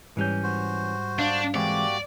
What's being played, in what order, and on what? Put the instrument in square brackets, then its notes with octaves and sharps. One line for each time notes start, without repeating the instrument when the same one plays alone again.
[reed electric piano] G#2 G3 G6 [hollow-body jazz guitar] E3 C#4
[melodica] F#4 C5
[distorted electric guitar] D4 [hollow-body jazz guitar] F5
[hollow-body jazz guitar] E3 G#3 C4 [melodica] A#3 F#4 G4 [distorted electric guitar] D5